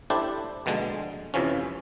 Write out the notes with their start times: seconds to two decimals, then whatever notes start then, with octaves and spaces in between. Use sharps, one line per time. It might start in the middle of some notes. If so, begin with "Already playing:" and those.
0.10 D4 E4 G4 A4 C5
0.66 A#1 B2 D3 G#3
1.34 F2 C3 E3 F3 C#4